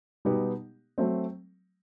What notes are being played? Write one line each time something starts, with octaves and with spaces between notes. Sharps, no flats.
B2 G3 B3 D#4 G4
F#3 A3 C4